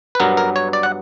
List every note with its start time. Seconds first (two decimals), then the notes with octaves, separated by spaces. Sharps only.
0.15 B4
0.20 G2 F#3 B3 A#4
0.37 A#4
0.56 C#5
0.73 D5
0.83 F#5